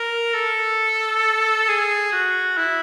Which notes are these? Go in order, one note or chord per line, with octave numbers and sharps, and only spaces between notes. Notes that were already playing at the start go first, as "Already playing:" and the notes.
Already playing: A#4
A4
G#4
F#4
E4